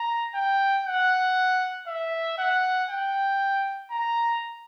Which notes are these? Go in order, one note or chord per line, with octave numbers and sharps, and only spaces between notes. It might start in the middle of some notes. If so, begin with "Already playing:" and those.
Already playing: A#5
G5
F#5
E5
F#5
G5
A#5